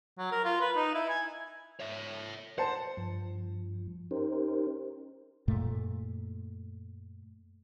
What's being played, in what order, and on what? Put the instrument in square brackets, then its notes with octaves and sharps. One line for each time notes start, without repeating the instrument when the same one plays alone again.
[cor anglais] F#3
A#4
F4
B4
D#4
E4
G#5
[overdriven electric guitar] C#5 E5
[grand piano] C5 A5 [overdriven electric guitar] F#5
[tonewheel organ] G2 F3
C#4 D#4 G4 A#4 C5
[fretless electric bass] F#2 A#2 A3